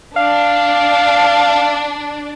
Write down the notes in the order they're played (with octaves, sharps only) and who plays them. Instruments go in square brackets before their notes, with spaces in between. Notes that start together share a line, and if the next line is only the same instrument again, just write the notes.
[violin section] D4 [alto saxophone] F5